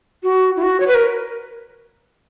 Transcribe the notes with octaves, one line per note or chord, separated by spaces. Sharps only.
F#4
E4
F#4
C#5
B4
A#4